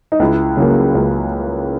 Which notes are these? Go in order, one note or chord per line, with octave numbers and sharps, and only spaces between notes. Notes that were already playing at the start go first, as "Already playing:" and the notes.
D#4
C#2 E4
C#3 F#3 A#3
C#2